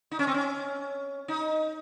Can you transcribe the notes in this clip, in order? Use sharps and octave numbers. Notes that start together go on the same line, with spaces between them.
D#4
C#4
C4
C#4
D#4